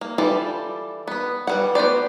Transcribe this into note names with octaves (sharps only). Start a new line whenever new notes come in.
A#3
E3 G3 F4 A4 D5
B3 B4
E3 G3 F#5
B3 F#4 C5 D5